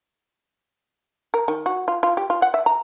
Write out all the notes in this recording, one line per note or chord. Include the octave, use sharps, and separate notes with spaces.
A#4
D#3
F#4
F4
F4
G4
F4
F#5
E5
A#5